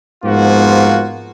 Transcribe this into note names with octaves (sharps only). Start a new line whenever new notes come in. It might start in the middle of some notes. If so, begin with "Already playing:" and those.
G#2 F3 A#3 B3 F4 F#4